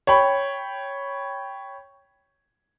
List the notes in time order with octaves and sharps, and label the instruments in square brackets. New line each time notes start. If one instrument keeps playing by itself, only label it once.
[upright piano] C#5 G5 B5